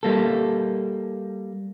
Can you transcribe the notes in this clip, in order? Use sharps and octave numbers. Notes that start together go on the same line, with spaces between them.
G3 A#3 A4